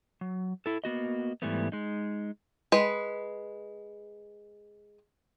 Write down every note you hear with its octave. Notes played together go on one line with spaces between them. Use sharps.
F#3
E4 A4
A#3 B3 F#4 D#5
G#2 E3 G3 A3 B3
G#3 D#4
G#3 B4